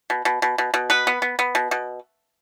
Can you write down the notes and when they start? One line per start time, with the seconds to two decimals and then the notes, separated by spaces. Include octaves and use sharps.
0.10 B2
0.25 B2
0.42 B2
0.58 B2
0.74 B2
0.90 B3 B4
1.07 B3
1.22 B3
1.39 B3
1.55 B2
1.71 B2